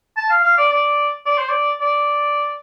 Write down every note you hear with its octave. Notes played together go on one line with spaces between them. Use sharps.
A5
F5
F5
D5
D5
D5
C5
D5
D5